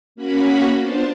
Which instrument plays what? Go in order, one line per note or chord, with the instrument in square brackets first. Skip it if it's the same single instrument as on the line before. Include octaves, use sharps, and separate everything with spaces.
[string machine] A#3 C#4 F#4 B5
B3 D4 F4 C5 A5